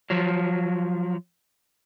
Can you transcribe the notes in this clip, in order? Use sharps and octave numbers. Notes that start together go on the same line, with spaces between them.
F3 F#3